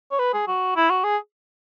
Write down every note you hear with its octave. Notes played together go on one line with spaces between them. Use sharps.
C#5
B4
G#4
F#4
E4
F#4
G#4